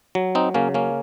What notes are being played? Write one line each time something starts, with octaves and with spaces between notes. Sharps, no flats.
F#3
C4 D#4
C#3 A#3 C#4
A#3 C#4